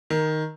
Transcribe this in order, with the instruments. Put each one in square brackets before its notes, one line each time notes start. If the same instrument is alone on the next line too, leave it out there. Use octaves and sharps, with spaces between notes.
[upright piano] D#3